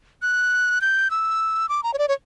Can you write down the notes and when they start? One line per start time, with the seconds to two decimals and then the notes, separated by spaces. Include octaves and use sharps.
0.22 F#6
0.81 G6
1.10 E6
1.69 D6
1.83 A#5
1.94 C#5
1.98 D5
2.08 C#5